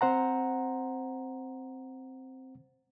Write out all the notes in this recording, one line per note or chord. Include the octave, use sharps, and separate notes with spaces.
C4 C5 F#5 A#5